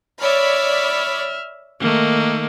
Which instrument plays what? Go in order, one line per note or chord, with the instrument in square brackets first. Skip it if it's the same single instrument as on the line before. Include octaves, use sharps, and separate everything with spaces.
[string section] C#5 D5 B5 [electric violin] E5 F6
[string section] D#3 [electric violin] A3 A#3